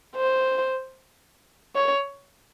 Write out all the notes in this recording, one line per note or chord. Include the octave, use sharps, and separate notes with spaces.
C5
C#5